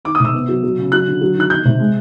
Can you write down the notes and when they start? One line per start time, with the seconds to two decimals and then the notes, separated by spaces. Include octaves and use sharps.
0.05 D#3 D6
0.15 D#6
0.20 C3
0.25 E6
0.34 B3
0.48 F#3
0.63 F#3
0.78 C#3
0.92 F#3 F#6
1.07 D3
1.21 F#3
1.36 D#3 F#6
1.50 D#3 G6
1.65 C3
1.80 G#3